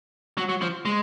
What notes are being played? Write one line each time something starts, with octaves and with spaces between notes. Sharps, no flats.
F#3
F#3
F3
G#3